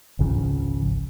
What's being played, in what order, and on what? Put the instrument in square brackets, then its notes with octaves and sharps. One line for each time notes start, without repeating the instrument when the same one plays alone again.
[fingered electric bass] G#1 C#2 C#3 F3